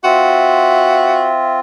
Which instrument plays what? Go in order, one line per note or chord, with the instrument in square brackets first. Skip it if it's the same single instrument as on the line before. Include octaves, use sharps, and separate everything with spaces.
[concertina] C4 F4 [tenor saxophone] F#4 [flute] E5